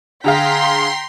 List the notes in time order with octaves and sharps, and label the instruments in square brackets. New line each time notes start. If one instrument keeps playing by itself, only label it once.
[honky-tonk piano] D3 G#4 F5 [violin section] G5 A#5 B6 [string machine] C6